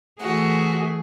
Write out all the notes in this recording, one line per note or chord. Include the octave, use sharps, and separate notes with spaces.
E3 A3 F#4 G#4